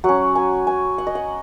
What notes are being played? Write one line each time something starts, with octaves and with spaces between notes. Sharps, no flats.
F#3 C#4 F#5
G#5
G#5
F#5
D#5
F#5